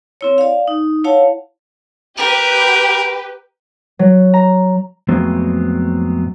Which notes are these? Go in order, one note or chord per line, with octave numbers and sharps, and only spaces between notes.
C4 E4 C#5
D5 F5
D#4
E4 C#5 F5 F#5 A5
G4 A#4 B4
F#3
A#5
F2 A2 F#3 G#3 B3 C4